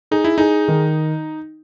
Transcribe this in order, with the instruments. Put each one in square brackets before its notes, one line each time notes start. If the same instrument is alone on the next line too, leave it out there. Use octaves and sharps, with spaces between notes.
[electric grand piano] D#4 [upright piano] G#4
[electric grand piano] E4
[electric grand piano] D#4 [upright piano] G#4
[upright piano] D#3